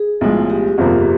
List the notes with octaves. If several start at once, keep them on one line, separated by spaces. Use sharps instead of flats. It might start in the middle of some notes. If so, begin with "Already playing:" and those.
Already playing: G#4
B1 A2 F3 G#3
G4
G1 F2 C3 F3 A#3